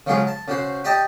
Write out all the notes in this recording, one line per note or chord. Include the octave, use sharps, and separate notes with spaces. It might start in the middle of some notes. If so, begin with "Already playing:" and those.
C#3 F3 F#3 G#3 G#4
A5
C#3 F#4 C5
G4 D5 D#5 G5 A5